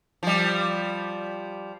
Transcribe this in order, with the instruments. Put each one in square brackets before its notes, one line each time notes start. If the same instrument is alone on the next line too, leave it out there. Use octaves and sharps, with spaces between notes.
[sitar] F3 G3